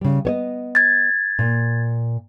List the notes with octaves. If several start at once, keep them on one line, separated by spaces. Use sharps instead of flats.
C#3 G3
B3 C#5 D#5
G#6 A6
A#2